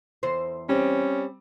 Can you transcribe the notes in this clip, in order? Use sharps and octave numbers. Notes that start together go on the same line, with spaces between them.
E2 C5
G3 C4 C#4